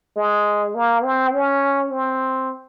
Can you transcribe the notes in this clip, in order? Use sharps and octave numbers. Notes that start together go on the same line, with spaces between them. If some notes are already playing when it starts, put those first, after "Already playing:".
G#3
A#3
C4
C#4
C4